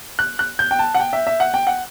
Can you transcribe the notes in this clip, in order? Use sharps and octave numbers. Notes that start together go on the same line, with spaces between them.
F#6
F#6
G6
G5
A5
F#5
G5
E5
E5
F#5
G5
F#5